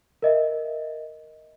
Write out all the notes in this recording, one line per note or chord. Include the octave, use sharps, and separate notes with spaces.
A#4 D#5 E5